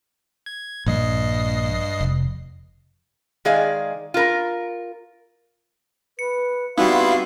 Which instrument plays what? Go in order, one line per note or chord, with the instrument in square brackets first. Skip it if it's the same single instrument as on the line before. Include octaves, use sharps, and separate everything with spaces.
[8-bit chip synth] G#6
[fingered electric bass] A#1 [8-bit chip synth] G2 D#5 C7
[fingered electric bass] F1
[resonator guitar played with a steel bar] D#3 G#3 G#4 D5 F5
F4 A#4
[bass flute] B4 [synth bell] C#7
[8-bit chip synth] G3 B3 E4 [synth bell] C4 D#4 [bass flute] F#4 [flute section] F5 C6